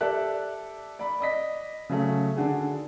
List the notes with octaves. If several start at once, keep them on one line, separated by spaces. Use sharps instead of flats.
G4 A4 D5 E5 F#6
D5 B5
D5 D#5 B6
C#3 F#3 A3 C#4
D3 D#3 D4 F#4 G#4